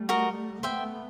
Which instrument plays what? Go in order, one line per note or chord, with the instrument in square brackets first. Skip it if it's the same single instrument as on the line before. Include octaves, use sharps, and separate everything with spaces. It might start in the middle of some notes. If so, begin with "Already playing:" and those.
Already playing: [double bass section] G3 A3
[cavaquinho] F#4 A#4 D#5
[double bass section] A3 B3 [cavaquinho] C5 E5 G5